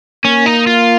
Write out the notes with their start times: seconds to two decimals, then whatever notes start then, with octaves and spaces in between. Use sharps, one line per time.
0.25 A#3 C#4
0.46 D#4
0.67 F4